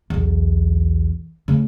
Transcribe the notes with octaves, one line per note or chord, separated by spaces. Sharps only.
B1 E2
C#3 A3